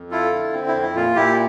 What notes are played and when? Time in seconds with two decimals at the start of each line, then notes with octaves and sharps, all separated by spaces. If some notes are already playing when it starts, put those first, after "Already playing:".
Already playing: F2
0.11 E4 F4 A4
0.32 D3
0.53 C4
0.68 E4
0.74 F2
0.82 E4
0.96 A#2 F4
1.15 A#2 E4 G4